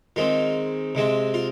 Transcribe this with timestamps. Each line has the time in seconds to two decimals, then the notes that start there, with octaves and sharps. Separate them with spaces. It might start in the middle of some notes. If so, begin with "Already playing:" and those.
0.16 D#3 G#3 C4 F4
0.95 C3 G#3 C4
1.34 F4